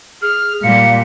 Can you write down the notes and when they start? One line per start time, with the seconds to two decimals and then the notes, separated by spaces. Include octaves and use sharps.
0.22 G#4 F6
0.63 A#2 G3 F5 C#7